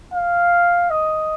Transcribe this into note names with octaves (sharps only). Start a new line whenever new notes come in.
F5
D#5